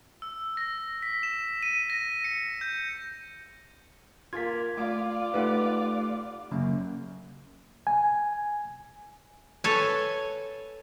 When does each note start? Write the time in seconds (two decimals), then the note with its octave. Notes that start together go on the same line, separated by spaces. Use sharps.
0.22 E6
0.57 A#6
1.02 B6
1.23 E7
1.63 D#7
1.90 A#6
2.24 C#7
2.61 G6
4.33 A#3 F4 G#6 B6
4.77 A3 F4 D5 D6
5.34 A3 D#4 G4 B4 F#5
6.51 F#2 C#3 A#3 C#4
7.87 G#5
9.64 A4 B4 C#5 G#5